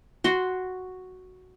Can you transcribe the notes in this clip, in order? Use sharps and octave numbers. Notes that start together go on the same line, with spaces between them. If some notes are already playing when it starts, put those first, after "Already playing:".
F#4 C6